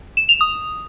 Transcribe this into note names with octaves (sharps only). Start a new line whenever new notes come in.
E7
F7
D#6